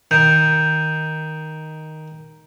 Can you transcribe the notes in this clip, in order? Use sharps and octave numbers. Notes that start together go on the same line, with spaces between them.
D#3 G6